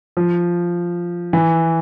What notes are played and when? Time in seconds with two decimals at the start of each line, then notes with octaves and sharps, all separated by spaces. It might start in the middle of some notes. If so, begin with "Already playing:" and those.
0.17 F3
1.33 E3